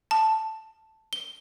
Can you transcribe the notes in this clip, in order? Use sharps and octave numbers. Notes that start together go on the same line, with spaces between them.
A5
G7